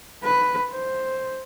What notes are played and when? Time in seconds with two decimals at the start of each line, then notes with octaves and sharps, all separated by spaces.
0.23 B4
0.71 C5